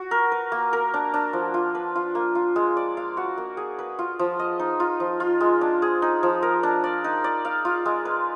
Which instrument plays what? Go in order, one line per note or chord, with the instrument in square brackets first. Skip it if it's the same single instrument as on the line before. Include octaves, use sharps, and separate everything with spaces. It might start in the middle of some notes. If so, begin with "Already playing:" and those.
Already playing: [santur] F#4
A#4
B4
A#3
A#4
D4
D4
F3
F4
B4
F4
A#3
F4
G#3
D5
F5
F#4
A#3
G#4
B4
F4
F3
D#5
D#4
F4
F3
F4
G#3
D4
G#4
D#4
F3
A#4
D4
D5
D#4
D5
F5
F4
G#3
B4